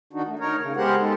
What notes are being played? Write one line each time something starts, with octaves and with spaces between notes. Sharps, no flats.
D#3 D4 D#4 F#4
A3
D#4 A#4 C#5
C#3
G#3 B3 G4 A#4 C5 F#5
G#3 D#4 A4